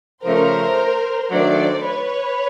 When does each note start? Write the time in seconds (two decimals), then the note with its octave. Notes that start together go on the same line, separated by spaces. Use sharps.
0.24 C#3 F3 A3 C#4 A#4 C5
1.30 D#3 F#3 A3 D4 C5 D5
1.84 B4 C#5